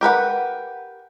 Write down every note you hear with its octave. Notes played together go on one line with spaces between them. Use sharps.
G4 A#4 B4 F#5